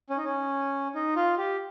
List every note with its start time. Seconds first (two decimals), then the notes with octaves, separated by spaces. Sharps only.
0.10 C#4
0.17 D#4
0.24 C#4
0.95 D#4
1.16 F4
1.38 G4